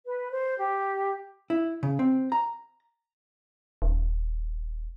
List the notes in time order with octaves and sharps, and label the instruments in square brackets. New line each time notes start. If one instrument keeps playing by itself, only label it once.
[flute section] B4
C5
G4
[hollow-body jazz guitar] E4
C#3
C4
A#5
[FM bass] D#1